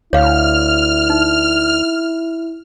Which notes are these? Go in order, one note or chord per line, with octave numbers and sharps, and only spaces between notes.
D2 E4 C#5 F5 F6
D#4